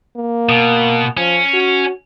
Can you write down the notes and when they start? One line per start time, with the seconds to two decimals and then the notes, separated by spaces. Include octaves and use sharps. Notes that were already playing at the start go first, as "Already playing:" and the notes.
0.16 A#3
0.49 B2
1.17 F3 C#4
1.54 F#4